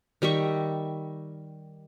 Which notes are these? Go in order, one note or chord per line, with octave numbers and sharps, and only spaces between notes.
D#3 G3 E5 C#6